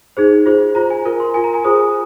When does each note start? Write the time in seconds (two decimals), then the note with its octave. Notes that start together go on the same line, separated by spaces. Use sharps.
0.17 D#4 G#4 C5
0.46 F4 G#4 C5
0.75 F4 C5 A#5
0.90 G#5
1.05 F4 A#4 A#5
1.20 C6
1.34 F4 A#4 G#5
1.44 A#5
1.54 G#5
1.64 F4 G#4 C5 D#6